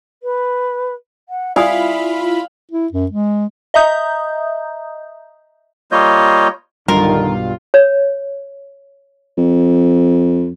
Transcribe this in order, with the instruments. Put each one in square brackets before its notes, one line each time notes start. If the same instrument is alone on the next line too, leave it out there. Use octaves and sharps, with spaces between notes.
[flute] B4
F#5
[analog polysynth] E4 F4 B5 [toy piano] D5 G#5 D#6 [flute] E5 [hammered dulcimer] F5
[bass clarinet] E4
F#2
G#3
[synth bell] D#5 E5 A#5 D#6 G6
[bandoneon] G3 A#3 F4 C#5 D#5 G6
[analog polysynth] B1 G2 F4 [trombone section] D3 D#3 [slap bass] G3 [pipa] A#4
[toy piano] C#5
[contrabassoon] F2